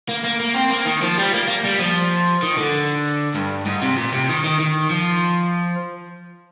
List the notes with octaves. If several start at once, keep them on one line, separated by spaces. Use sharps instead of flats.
A#3
A#3
A#3
C4
A#3
D#3
F3
G3
A#3
A#3
G3
F3
D#3
D3
G2
G#2
C3
A#2
C3
D#3
D#3
D#3
F3